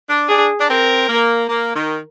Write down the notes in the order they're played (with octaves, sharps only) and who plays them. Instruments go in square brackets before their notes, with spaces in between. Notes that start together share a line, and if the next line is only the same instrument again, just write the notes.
[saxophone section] D4
[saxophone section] D4 [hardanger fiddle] G#4
[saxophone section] D4
[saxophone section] C4 [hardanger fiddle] A#4
[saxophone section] A#3
A#3
D#3